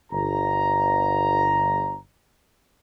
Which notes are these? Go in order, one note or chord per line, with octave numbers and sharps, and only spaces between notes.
G1 A#5